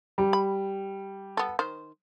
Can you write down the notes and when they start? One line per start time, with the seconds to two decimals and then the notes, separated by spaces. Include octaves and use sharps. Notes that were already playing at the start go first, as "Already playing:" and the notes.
0.18 G3
0.33 B5
1.37 B3 A4
1.59 D#3 C5